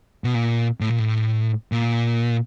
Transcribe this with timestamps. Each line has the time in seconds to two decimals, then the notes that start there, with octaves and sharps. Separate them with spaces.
0.24 B2
0.35 A#2
0.81 A2
0.89 A#2
0.99 A2
1.72 A#2